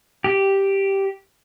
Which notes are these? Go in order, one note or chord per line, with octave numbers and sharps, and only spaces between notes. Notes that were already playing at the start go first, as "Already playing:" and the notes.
G4